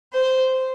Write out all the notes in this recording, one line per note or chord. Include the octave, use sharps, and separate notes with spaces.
C5